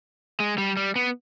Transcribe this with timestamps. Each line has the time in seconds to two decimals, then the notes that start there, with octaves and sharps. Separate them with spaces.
0.40 G#3
0.58 G3
0.77 G3
0.96 B3